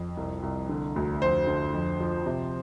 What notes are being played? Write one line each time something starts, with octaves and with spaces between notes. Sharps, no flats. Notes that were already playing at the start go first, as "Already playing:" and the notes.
Already playing: F2
C2
C2
D3
D2
F2 C5
D3
F2
F3
C3